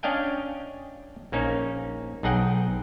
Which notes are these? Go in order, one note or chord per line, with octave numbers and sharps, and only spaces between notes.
C#4 D4 D#5 F5 G5 G#5
A#1 A#3 C#4 D#4
B1 D#4 G#4 F#5 G5